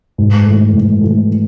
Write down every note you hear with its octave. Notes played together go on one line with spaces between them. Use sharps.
G#2
E3 A3
G#2
E3 A3